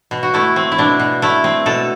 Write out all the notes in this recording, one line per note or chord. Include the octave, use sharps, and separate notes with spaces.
B2
F#4
A3 E4
C4
E4
B2 D4
B2
A3 E4
C4
B2 A4